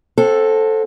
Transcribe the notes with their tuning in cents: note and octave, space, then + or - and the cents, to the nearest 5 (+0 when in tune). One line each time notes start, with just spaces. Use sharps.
C4 +20 A4 +0 F#5 -35